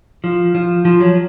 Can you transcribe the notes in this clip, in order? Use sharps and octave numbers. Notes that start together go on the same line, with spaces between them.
F3
F3
F3
F#3